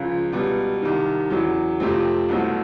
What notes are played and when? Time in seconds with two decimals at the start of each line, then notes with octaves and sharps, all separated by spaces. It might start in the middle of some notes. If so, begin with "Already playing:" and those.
Already playing: C#2 C#3 F3
0.32 C#2 B2 G3 B3
0.82 C2 C3 D#3
1.30 E2 C#3 F#3
1.80 F2 C3 F3 A3 C4
2.29 C2 B2 F#3 A3 C4